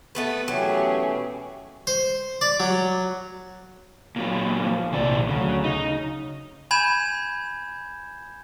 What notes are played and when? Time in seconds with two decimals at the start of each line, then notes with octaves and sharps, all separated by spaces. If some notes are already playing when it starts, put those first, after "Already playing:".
0.15 A3 B3 B4
0.48 B2 E3 F#3 A3 C#4 G4 G#4
1.87 C5
2.41 D5
2.60 F#3
4.16 A#2 F#3
4.60 F3
4.92 A#1 G#2 C3 D#3 D5
5.29 D2 C#3 F#3
5.64 C#3 D#4
6.71 G#5 B5 G6 G#6 E7